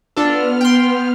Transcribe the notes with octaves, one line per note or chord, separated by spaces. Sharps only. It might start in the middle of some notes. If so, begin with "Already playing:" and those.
B3 D4 F4 A4 F6
G5 C6